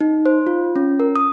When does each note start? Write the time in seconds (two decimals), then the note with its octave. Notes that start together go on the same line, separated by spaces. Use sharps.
0.01 D#4
0.26 C5
0.47 F4
0.76 C#4
1.00 A#4
1.16 D#6